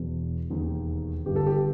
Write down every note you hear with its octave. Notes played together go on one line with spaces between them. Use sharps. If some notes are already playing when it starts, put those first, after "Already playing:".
Already playing: E1 E2 B2
E1 D#2 D#3
G1 G2 D#3 G4
A4
G4